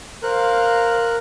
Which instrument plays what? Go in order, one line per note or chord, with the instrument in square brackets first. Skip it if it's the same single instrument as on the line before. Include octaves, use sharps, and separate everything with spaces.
[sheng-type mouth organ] A#4 F#6 [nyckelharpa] C5 F5